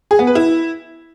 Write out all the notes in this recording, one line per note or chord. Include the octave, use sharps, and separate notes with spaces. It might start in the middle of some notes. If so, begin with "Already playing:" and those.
G#4
B3
B4
E4